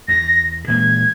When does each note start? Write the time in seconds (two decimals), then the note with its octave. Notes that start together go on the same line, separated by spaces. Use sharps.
0.08 E2 A#6
0.68 A#2 E3 G#3 G#6